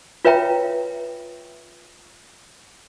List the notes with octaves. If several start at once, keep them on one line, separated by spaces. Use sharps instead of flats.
F4 B4 C#5 E5 G5 A#5